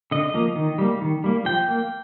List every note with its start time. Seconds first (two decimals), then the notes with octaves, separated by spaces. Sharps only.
0.11 D3 D#5
0.34 F3 A#3
0.56 D#3
0.78 G3 A#3
1.01 D#3
1.24 G3 A#3
1.45 F3 G5
1.68 A#3